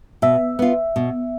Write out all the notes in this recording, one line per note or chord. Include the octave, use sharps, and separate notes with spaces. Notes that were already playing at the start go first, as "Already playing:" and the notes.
B2 E5
B3 F4
B2